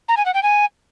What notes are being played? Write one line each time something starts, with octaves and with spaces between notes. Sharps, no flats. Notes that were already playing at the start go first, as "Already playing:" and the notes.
A#5
G#5
F#5
G5
G#5